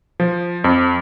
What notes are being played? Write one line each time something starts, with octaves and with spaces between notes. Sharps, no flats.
F3
F2